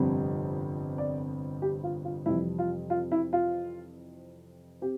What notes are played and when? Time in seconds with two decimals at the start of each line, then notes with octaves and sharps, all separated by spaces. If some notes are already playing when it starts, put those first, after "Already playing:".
Already playing: G1 F2 C3 G3 C4
0.98 D5
1.62 G4
1.83 F4
2.05 F4
2.26 F2 C3 E3 G3 E4
2.59 F4
2.90 F4
3.12 E4
3.33 F4
4.81 C4 G4